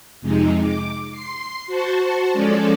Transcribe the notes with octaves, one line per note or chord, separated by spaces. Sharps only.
F2 C3 G#3 D#4
D6
C6 C7
F#4 C5 A5 C#6
F3 G#3 C#4 A4 D5